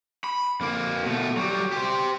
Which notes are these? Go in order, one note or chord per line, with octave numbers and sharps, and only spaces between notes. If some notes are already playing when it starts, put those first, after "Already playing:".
B5
F2 A#3
B2 A3
F#3 G3
G4 C5